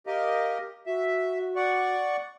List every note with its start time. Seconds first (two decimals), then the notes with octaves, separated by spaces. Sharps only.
0.07 G4 A#4 D#5 F5
0.86 F#4 E5
1.56 D5 F#5 C#6